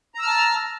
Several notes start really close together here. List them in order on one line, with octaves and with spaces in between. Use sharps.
A#5 E6 F6 A5